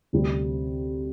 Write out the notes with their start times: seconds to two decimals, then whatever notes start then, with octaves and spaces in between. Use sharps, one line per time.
0.13 D2 C3 G3 C4